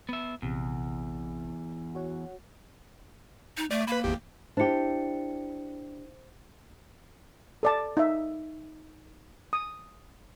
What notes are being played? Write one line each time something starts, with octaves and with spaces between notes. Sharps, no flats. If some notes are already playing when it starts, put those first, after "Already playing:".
B3 E5
A#1 E2 C3
F#4 C#5 F#5
D#4
A3 D5
A#3 B4 B5
G#1 E2 G4
D4 E4 G4 C5 C#7
A4 D5 A5
D#4 E5
D#6